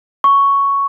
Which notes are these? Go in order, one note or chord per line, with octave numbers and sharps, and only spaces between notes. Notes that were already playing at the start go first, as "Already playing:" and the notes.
C#6